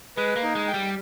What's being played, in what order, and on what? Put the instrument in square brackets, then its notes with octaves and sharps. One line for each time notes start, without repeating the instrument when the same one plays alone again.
[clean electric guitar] G#3 [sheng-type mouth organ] B4
[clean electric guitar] A#3
[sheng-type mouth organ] D#4
[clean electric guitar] G#3
[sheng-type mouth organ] G5
[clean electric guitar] G3